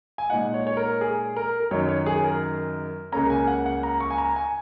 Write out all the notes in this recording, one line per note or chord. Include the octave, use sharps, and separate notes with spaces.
G#5
A#2 G#3 D#4 F#5
C#5
C#5
A#4
G#4
A#4
A#4
F#2 D#3 F#3 D#4 C#5
C#5
G#4
A#4
C#2 C#3 A#3 C#4 A#5
G#5
F#5
F#5
A#5
C#6
G#5
A#5
G#5